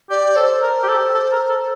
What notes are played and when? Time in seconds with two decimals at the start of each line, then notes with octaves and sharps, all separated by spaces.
0.10 G4 D5
0.36 A4 C5
0.62 A#4 C5
0.83 G4
0.88 A4
1.14 A4
1.32 A#4
1.49 A4